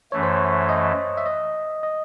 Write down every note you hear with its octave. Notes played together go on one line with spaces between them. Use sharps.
F#2 E3 A3 C#5
C5
C#5
D#5
E5
D#5
D#5